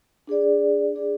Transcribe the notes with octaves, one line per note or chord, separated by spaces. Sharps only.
D4 G#4 D5
D4 G#4 D5